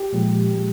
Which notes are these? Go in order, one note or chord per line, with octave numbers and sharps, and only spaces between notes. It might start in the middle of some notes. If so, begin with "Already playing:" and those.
Already playing: G4
A#2 F3 G#3
A#2 F3 G#3